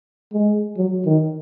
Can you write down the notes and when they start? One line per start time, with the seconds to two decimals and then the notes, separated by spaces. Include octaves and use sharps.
0.33 G#3
0.77 F#3
1.06 D#3